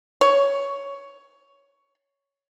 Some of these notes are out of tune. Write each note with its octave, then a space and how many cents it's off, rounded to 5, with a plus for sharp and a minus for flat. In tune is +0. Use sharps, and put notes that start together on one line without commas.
C#5 +5